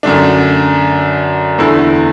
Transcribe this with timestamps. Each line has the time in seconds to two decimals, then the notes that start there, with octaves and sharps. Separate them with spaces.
0.03 F#2 D3 A3 D4
1.58 E2 D3 A3 E4